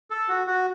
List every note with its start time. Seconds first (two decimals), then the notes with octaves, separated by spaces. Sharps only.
0.10 A4
0.28 F#4
0.47 F#4